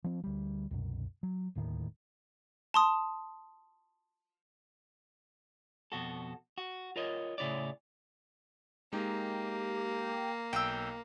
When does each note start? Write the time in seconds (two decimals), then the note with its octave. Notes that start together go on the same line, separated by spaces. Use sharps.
0.04 F3 C4
0.24 D2 G3
0.71 C2 F#2 B2
1.23 F#3
1.55 D1 D#2 A2 D#3
2.74 A5 C6 D#6
5.92 F2 B2 F#4 A4
6.58 F#4
6.96 F4 A#4 C#5 D#5
7.38 A2 C#3 E4 C#5 D5
8.93 G#3 A#3 D#4 G4
10.53 B1 G5 E6